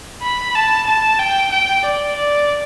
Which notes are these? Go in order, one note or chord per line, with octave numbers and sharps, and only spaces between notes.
B5
A5
A5
G5
G5
D5
D5